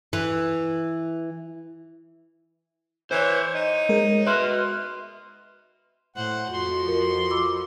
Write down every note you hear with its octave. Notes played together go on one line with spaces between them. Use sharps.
E3
E3 C5 C#5
D#4
G#3 A#4
B4 D#5 E5 C6 F6
A2 C5 F#5
F2 F3 F#4 C6
A#4
B5 D6 E6